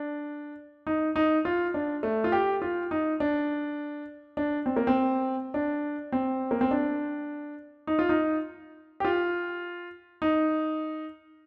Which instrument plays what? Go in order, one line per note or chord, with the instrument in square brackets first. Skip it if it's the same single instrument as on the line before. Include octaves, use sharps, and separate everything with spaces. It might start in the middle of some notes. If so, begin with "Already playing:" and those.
Already playing: [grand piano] D4
D#4
D#4
F4
D4
A3
F4
G4
F4
D#4
D4
D4
C4
A#3
C4
D4
C4
A#3
C4
D4
D#4
F4
D#4
G4
F4
D#4